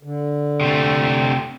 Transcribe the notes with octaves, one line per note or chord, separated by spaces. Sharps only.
D3
C3 A3